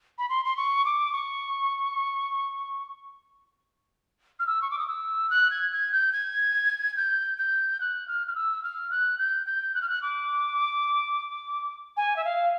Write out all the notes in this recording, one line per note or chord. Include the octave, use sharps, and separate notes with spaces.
B5
C6
C6
C#6
D6
C#6
F6
E6
C#6
D6
D#6
E6
F#6
G#6
G#6
G6
G#6
G6
G6
F#6
F6
F6
E6
F6
F#6
G6
G6
F#6
F6
F#6
D6
G#5
E5
F5